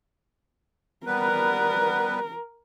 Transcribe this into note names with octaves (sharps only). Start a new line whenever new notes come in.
G3 B3 A#4 B4